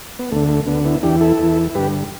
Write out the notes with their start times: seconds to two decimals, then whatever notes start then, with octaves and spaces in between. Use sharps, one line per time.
0.19 B3
0.32 D2 D3 A3
0.49 A3
0.67 D2 D3 B3
0.85 B3 E4
1.03 E2 E3 D4 G4
1.21 E4 A4
1.39 E2 E3
1.75 G2 D3 G4 B4